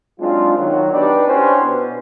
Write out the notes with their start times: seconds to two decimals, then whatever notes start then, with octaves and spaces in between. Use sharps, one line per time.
0.20 F#3 G#3 C4 D4 D#4 F4
0.57 D#3 F#3 F#4
0.92 B3 D4 D#4 G4 B4 D5
1.27 C#4 D4 E4 F#4 G4 C5
1.63 B2